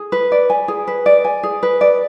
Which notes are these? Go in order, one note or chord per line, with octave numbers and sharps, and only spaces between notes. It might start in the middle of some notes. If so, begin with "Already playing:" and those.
Already playing: G#4
B4
D5
G#5
G#4
B4
D5
G#5
G#4
B4
D5